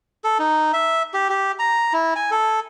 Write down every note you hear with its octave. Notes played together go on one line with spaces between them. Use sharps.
A4
D#4
E5
G4
G4
A#5
E4
G#5
A4